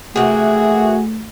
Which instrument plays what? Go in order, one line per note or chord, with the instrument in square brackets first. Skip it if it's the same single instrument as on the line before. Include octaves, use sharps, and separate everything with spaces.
[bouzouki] C3 E3 A#3 [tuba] A3 [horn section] F#4 [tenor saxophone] G#4